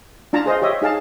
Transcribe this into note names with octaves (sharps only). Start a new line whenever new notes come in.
D4 F4 A5 A#5
G#4 C5 D#5 F5
G4 C#5 D#5 E5
D#4 G#4 F5 A5